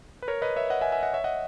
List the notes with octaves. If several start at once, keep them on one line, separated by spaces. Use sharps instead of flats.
B4
A#4 C#5
B4 D#5
C#5 E5
D#5 F#5
E5 G#5
E5 G#5
D#5 F#5
C#5 E5
D#5 F#5